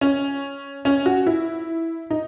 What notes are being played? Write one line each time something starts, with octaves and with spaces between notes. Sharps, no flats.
C#4
C#4
F#4
E4
D#4